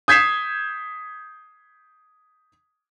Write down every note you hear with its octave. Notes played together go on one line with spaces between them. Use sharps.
D#6 G6 G#6 B6 C7 E7